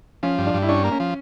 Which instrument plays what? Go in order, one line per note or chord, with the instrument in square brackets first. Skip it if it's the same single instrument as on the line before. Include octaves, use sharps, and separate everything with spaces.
[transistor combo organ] F3 [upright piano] C#4
[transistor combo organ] G2
[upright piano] D4
[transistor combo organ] G2
[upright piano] E4
[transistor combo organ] C#4 [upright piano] D4
[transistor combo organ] A#3
[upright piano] C#4
[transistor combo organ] F3